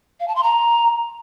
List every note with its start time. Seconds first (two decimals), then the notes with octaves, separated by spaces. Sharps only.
0.20 F5
0.28 A5
0.35 C6
0.43 A#5